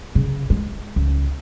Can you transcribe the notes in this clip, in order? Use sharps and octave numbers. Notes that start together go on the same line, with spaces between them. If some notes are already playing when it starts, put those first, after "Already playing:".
C#3
G#3
C#2